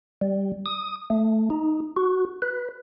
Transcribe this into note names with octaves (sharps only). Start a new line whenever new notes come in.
G3
D#6
A3
D#4
F#4
B4